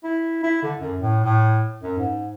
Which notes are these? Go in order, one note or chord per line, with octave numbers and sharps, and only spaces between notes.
E4
E4
D3
F#2
A2
A2
F#2
G#2